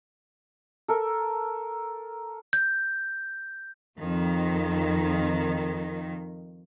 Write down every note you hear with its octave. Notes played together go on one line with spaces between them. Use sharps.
A4 A#4
G6
F2 D#3